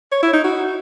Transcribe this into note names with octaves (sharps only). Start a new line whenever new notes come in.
C#5
E4
D#4
F#4